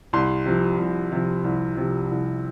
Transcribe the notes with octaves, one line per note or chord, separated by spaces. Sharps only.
C2 C6
C3 F3
C2
C3 F3
C2
C3 F3
C2